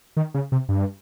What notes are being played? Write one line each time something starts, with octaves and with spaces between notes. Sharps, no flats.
D#3
C#3
C3
G2